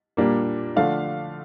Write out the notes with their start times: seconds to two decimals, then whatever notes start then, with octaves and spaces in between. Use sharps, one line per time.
0.17 A#2 G3 A#3 D4
0.76 D3 F3 A3 D4 F5